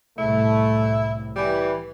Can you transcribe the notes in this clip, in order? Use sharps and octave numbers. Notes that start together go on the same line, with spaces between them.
C2 A2 A3 E4
E3 G3